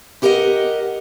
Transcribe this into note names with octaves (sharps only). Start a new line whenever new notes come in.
E4 G4 A#4 B4 D#5 F#5